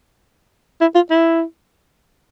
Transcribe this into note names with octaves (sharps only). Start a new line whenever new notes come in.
E4
F4
E4